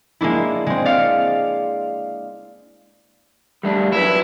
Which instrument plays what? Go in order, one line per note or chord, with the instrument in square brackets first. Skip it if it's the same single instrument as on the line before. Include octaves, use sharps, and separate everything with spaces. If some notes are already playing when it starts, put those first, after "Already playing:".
[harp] G#3 A#3 D4 E4
G#3 C4
D5 F5 F6 C#7
[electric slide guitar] G3 A3 D4
[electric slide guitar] F#3 D4 B4 [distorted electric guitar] E4